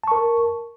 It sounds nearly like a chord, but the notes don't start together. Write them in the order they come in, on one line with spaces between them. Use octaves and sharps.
A5 C#6 A#4